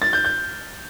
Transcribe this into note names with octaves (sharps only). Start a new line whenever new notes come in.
A6
G6
G6